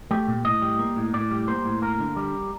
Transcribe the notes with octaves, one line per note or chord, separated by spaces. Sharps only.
A3 G4
A#2
A2 D#5
G3
A#3
A2
A2 D5
G3
A#3 C5
A2
A#3 A#4
D3
G3